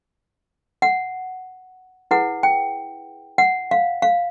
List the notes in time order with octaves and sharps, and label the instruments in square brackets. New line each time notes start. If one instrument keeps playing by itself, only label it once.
[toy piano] F#5
E4 G#4 B4 F#5
G5
F#5
F5
F5